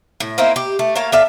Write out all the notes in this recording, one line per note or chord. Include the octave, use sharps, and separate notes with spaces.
A2
A#3 C4 D#4 E4
G4
A3
A#3 C#5 F5 A5
D4 A4 E5 F5